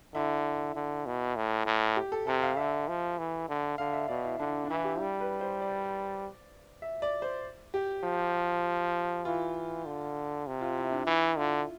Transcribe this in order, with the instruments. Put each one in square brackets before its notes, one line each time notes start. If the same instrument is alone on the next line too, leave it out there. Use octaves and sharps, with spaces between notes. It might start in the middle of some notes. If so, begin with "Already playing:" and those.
[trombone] D3 [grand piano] E4
[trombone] D3
B2
A2
A2
[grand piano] G4
A4
[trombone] C3 [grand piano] A4
[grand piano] F5
[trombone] D3 [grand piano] E5
[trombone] F3
E3
D3
[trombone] D3 [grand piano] F5
[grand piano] E5
[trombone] B2 [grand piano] D5
[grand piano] E4
[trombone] D3 [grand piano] D4
[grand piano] D4
[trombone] E3 [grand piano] E4
[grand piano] G4
[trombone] G3
[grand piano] B4
C5
D5
E5
D5
C5
G4
[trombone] F3
[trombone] E3 [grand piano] F4
[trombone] D3
C3
[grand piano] F4
E4
D4
[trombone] E3 [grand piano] E4
[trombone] D3 [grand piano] F4